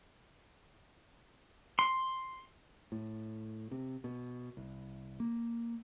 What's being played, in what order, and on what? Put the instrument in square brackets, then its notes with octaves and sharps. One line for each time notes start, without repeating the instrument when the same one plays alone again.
[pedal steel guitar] C6
[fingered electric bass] A2
C3
B2
C2
A#3